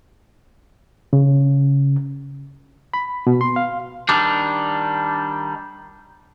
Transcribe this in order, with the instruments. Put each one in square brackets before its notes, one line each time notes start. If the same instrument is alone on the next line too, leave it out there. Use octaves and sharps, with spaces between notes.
[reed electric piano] C#3
B5
B2
C6
F5
[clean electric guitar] D#3 G3 D4